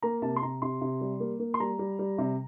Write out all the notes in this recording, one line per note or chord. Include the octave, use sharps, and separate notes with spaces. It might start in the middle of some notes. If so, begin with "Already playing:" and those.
A#3 A#5
C3 A5
C6
C3 A#5
C3 C6
C3
G3
A#3
A#3
C6
G3 A#5
G3
G3
C3